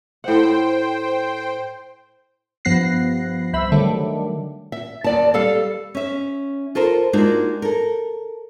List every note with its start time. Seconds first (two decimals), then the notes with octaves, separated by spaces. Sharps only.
0.24 A2 C5 F#5 G5
2.65 G2 F3 B3 F#6 A#6 C7
3.53 C2 C5 E5 B5 E6
3.72 D3 D#3 F#3 G3 A3 D4
4.72 E5
5.04 D#2 D5 A5
5.34 G3 A4 F5
5.95 C#4 E5
6.75 F4 A4 A#4 C5
7.13 G#3 A#3 D4 D#4 F4 F#4
7.62 A4 A#4